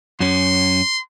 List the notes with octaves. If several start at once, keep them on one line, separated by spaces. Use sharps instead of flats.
F#2 C#4 C6